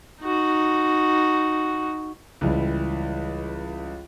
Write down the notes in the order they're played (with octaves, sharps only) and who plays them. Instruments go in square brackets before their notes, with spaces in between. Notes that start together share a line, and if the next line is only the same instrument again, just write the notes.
[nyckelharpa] D#4 F#4
[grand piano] C#2 E3 G3